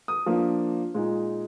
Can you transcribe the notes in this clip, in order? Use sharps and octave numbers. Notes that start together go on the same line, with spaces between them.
D#6
F3 A#3 D4
A#2 G#3 D#4